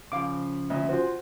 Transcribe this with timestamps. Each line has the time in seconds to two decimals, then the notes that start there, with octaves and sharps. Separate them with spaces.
0.12 C#3 F3 F5 D6
0.70 D2 A#2 D#5 E5
0.89 F4 F#4 C5